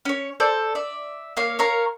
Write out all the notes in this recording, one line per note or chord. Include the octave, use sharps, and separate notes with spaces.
C#4 C#5
A4 C5 D5
D5 E5
A#3 C#5 F5
A#4 C#5 F5 A#5